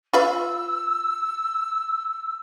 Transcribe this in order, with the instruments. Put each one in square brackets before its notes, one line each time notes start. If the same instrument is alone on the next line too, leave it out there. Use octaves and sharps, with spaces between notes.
[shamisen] F4 B4 F5 [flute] E6